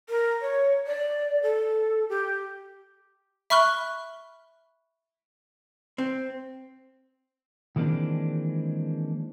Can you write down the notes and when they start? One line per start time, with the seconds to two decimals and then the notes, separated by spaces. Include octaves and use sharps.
0.09 A#4
0.41 C#5
0.87 D5
1.43 A4
2.09 G4
3.50 E5 B5 C#6 F6 F#6 G7
5.98 C4
7.76 D#3 E3 G#3 A#3 C4 D4